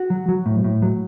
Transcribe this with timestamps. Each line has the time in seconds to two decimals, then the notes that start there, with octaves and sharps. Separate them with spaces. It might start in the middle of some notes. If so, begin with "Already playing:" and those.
Already playing: F#4
0.10 F#3
0.28 F#3
0.46 A2
0.64 A2
0.82 F#3